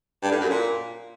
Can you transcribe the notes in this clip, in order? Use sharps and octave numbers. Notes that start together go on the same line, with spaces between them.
G2
A2
F#2
A#2